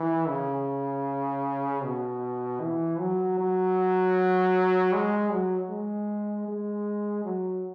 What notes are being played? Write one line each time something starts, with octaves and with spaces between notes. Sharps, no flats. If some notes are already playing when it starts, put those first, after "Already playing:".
Already playing: E3
C#3
B2
E3
F#3
F#3
G#3
F#3
G#3
G#3
F#3